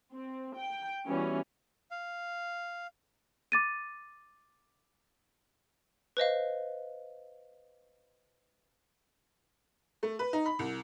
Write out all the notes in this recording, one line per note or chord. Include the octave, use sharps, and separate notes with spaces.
C4
G5
E3 G3 B3 C#4 F#4
F5
D6 A6 D#7
B4 C5 D#5 F5
A3
B4
D#4
B5
C2